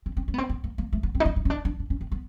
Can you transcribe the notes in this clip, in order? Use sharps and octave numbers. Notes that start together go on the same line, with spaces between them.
C4
C4
C#4
B3
C4
B3
A#3
A#3
A3
B3
C4
D#4
D4
D#4
C#4
D4
D4
D4
C#4
C4
B3